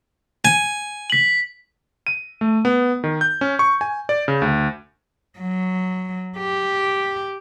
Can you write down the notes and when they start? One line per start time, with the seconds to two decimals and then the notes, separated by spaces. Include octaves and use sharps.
0.45 G#5
1.10 B6 F#7
2.07 D#7
2.41 A3
2.65 B3
3.04 D#3
3.21 G6
3.41 C#4
3.59 C#6
3.81 G#5
4.09 D5
4.28 C#3
4.42 D2
5.39 F#3
6.38 G4